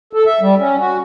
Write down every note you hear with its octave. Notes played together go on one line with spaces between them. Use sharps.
A4
E5
G3
C#4
F#4